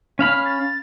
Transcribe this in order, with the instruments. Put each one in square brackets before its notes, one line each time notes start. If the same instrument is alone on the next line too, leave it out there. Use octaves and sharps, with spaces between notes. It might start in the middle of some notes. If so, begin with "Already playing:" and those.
[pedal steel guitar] C#4 F5 B5 [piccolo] F6
[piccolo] A6